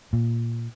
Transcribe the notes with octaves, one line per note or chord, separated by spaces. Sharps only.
A#2